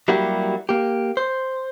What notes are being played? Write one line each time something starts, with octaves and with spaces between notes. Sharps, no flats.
F#3 G3 A#3 E4 F#4 G4
A#3 G4
C5